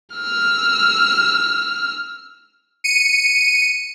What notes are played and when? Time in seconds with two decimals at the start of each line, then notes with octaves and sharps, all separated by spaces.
0.16 E6 F6
2.84 C#7 D#7